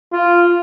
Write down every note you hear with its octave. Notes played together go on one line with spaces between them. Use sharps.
F4